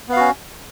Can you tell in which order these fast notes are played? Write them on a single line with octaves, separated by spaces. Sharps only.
B3 F5 F#4 C#4